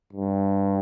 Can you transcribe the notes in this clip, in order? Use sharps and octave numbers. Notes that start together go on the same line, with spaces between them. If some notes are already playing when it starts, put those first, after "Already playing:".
G2